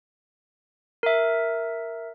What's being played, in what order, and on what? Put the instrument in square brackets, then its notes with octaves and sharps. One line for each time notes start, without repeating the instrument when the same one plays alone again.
[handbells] A#4 E5